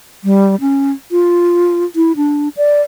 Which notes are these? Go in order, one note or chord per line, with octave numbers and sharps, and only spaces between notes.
G3
C#4
F4
E4
D4
D5